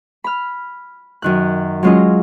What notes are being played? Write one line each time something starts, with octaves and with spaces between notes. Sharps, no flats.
B5 F6
F#2 D#3 F#6
F#3 G#3 C#4 F4 G#4 D#5